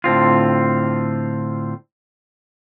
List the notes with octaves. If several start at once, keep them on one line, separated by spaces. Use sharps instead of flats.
A2 D3 C4 F4